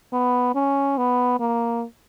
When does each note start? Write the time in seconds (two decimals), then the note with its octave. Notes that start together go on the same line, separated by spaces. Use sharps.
0.13 B3
0.55 C#4
0.97 B3
1.39 A#3